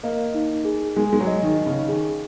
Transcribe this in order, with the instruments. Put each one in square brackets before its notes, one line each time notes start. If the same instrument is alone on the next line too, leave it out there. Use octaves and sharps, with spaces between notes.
[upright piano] A#3 [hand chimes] D#5
[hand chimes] D#4
G#4
[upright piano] G#3 [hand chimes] G#5
[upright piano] G#3
F#3
[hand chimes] D#5
[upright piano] D#3
[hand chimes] D#4
[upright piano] C#3
[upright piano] D#3 [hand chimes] G#4